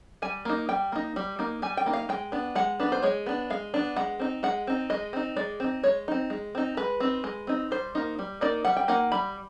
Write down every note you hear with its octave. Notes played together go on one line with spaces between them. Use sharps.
G3 G#5
A#3 D#4
G3 G5
A#3 D#4
G3
A#3 D#4
G3 G#5
G5
A#3 D#4
F5
G#3 G5
B3 D4
G#3 F#5
B3 D4 B4
C5
G#3 C#5
B3 D4
G#3 F5
B3 D4
G#3 F#5
C4 D#4
G#3 F#5
C4 D#4
G#3 D#5
C4 D#4
G#3 D5
C4 D#4
G#3 C#5
C4 D#4
G#3
C4 D#4
G#3 B4
C4 D#4
G#3
C4 D#4
G3 C5
A#3 D#4
G3
A#3 D#4 D5
G3 F#5
G5
A#3 D#4 F#5
G3 B5